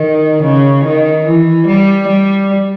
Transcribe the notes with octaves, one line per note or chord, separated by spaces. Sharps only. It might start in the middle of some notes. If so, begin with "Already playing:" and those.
Already playing: D#3
C#3
D#3
E3
G3
G3